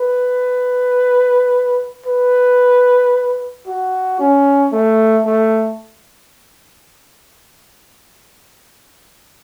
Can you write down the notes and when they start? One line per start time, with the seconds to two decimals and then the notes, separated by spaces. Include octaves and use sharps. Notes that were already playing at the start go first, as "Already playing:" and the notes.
Already playing: B4
2.06 B4
3.67 F#4
4.20 C#4
4.72 A3
5.26 A3